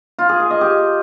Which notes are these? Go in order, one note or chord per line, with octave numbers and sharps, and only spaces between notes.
F4
G#4
G#5
D#5
G4